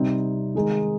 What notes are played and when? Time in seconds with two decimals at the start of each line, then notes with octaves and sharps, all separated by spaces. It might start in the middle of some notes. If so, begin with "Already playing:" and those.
Already playing: C3 G3 C4 D#4
0.55 D#3 G#3 D#4